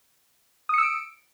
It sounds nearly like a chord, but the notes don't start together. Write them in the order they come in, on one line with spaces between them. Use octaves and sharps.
D#6 C#7 E6 D7